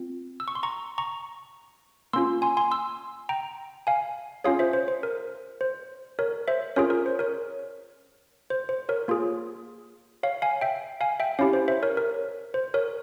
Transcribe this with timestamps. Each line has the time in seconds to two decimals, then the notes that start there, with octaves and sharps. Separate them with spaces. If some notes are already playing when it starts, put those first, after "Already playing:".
Already playing: C4 F4
0.40 E6
0.48 C#6
0.55 C6
0.63 A#5 C#6
0.98 A#5 C#6
2.13 A#3 C#4 F4 C6 E6
2.42 G#5 C6
2.57 G#5 C6
2.71 C6 E6
3.29 G5 A#5
3.87 F5 G#5
4.44 C#4 F4 G#4 C#5 F5
4.59 C5 E5
4.73 C5
4.88 C5
5.03 A#4
5.61 C5
6.19 A#4 C#5
6.48 C5 E5
6.76 C#4 F4 G#4 A#4 C#5
6.90 A#4
7.06 C5
7.19 A#4 C#5
8.50 C5
8.69 C5
8.89 A#4 C#5
9.08 A#3 F4 G#4
10.23 C#5 F5
10.42 F5 G#5
10.61 E5 G5
11.01 F5 G#5
11.20 E5 G5
11.39 C#4 E4 G4 C#5 F5
11.53 C5
11.68 C5 E5
11.83 A#4 C#5
11.97 A#4
12.54 C5
12.74 A#4 C#5